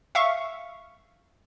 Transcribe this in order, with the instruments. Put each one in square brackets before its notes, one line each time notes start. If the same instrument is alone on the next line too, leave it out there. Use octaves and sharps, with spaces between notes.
[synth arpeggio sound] E5 F5 C#6